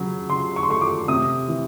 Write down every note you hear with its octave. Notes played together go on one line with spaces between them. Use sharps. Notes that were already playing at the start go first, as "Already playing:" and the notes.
Already playing: C#3 F#3
C#3 C6
C#6
C6
A3 C#6
D6
C3 D#6
E3